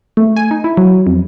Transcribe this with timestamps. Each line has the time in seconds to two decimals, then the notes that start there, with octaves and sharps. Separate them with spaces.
0.17 A3
0.36 G#5
0.51 D#4
0.64 E4
0.77 F#3
1.07 F2